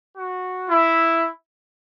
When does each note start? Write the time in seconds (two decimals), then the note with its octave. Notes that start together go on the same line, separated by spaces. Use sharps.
0.15 F#4
0.70 E4